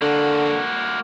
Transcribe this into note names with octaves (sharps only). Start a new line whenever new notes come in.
D3 A#3 F#4